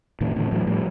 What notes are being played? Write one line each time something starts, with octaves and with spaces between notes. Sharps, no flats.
A2 D#3
A2 D3 E3
A2 E3 F#3
A2 F3 G3